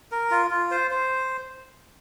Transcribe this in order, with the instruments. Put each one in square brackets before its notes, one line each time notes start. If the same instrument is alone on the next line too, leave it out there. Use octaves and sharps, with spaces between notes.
[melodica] A#4
F4
F4
C5
C5